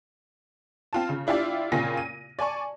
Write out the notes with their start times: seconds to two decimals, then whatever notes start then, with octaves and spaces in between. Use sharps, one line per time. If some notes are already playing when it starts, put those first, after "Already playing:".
0.93 C4 F4 A5
1.09 C#3
1.27 D4 E4 F4 G4 D5
1.72 A#2 C#3 C4 F4 G#5 A#6
1.97 D#7
2.39 D5 G#5 A5 C#6